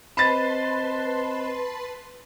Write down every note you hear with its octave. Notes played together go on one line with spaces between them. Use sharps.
C4 B4 C5 D#5 A5 B5 C6 A6